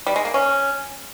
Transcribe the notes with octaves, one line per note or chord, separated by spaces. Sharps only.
G3
G#3
A#3
C#4